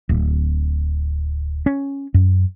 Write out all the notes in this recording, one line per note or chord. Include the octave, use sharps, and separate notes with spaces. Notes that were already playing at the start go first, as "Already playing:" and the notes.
D1
C#4
F#2